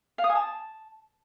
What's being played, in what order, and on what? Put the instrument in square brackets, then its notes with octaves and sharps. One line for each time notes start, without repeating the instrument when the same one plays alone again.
[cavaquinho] F5
D#6
G#5
A5